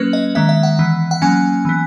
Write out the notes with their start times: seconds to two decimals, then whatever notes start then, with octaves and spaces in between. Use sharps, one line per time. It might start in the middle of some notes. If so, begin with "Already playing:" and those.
Already playing: F#3 A#3 C#4 B4
0.13 D#5
0.35 D#3 G#3 B3 E5
0.49 E5
0.63 F#5
0.79 E3 B3
1.11 F#5
1.22 F#3 A#3 C#4 G#5
1.65 E3 B3